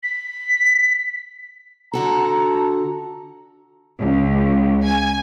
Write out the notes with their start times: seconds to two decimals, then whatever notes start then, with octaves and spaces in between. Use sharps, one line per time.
0.03 B6
1.93 D3 F#4 A4 A5 A#5
4.01 C#2
4.84 G#5